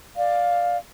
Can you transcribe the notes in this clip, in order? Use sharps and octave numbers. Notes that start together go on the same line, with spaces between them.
D5 F5